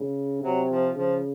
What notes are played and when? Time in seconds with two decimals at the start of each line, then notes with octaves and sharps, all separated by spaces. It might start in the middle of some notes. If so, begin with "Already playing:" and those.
Already playing: C#3
0.42 C3 F#3
0.69 F3
0.95 C#3 F3